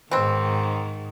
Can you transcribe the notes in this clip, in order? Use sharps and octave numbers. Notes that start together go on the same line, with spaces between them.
G#2 B2 D#3 C4